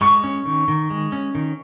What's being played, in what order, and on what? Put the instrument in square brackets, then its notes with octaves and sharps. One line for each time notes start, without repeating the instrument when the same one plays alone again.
[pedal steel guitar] G#3 [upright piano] C#6
[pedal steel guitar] C#4
D#3
D#3
G#3
C#4
D#3